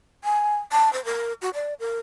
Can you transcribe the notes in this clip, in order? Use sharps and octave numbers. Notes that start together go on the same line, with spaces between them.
G#5
A5
C5
A#4
F#4
D5
A#4